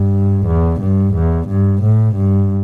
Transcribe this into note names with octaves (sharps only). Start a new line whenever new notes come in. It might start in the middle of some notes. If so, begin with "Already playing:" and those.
Already playing: G2
E2
G2
E2
G2
A2
G2